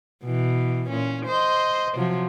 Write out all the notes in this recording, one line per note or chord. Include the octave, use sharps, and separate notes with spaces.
B2 E3
A#2 C#4
C5 D#5
C3 F3 F#3